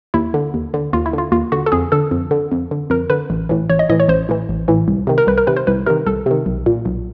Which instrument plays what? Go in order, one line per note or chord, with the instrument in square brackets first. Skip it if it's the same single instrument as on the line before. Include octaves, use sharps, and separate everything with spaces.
[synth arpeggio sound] D#2 E4
D3
D#2
D3
D#2 F4
E4
D3 F4
D#2 F4
D3 F#4
A4
F2 G#4
D3 A4
F2
D3
F2
D3
F2 A#4
D3 B4
A1
A2 E3
A1 C#5
D#5
A2 E3 D#5
C#5
A1 C5
A2 E3
A1
A2 E3
C2
C3 D#3
A#4
C2 B4
A#4
C3 D#3 B4
C5
C2 B4
C3 D#3 A#4
C2 A4
C3 D#3
B1
A#2
B1